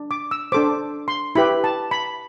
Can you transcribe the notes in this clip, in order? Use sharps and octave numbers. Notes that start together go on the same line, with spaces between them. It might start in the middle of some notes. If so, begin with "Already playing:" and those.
Already playing: D4
D6
E6
D4 A4 C5 D6
C6
E4 G4 B4 B5
A5
B5